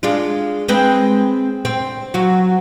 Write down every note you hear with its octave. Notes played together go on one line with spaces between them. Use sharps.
G#3 D4 F4
G#3 C4 B4
C4
F#3 F#4